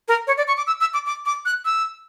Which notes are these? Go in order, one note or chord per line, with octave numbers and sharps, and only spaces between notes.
A#4
C#5
D5
C#6
D6
E6
E6
D6
D6
D6
F#6
E6